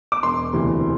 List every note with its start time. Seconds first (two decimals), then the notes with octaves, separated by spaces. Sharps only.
0.12 D6
0.23 E1 C6
0.53 D2 C3 E3